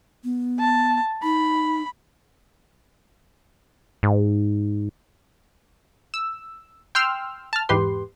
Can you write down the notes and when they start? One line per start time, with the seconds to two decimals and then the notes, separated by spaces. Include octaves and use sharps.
0.24 B3
0.59 A5
1.23 D#4 B5
4.03 G#2
6.14 E6
6.95 G5 C6 E6 F6
7.53 A5 F6
7.69 E2 G#2 G4 B4 C6